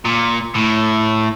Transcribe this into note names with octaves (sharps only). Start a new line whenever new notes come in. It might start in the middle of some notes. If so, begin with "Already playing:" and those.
A#2
A2